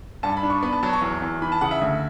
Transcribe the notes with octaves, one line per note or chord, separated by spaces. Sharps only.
G2 A5
B5
D4
C#6
B3 B5
A5
F#3 A5
C#6
E2
E2
E3 B5
A5
C#3 F#5
E5
D2